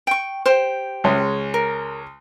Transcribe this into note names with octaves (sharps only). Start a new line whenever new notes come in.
G5 C#6
G4 C5
C#2 G#3 C#4
A#4